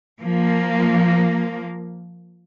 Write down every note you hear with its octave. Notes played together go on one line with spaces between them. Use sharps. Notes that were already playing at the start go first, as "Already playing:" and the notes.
F3 A#3